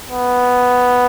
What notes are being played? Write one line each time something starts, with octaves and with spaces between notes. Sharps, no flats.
B3